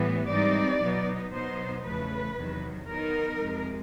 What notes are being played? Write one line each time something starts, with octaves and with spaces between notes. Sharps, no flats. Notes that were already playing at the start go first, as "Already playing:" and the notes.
Already playing: A2 E3 G3 B3
G#2 E3 G3 C4 D#4 D5
B2 F#3 B3 D#4
B2 F#3 B3 D#4 C5
E2 C#3 F3 A3 B4
E2 C3 D#3 F#3
D#3 F#3 B3 D#4 A#4
F2 C3 F3 G#3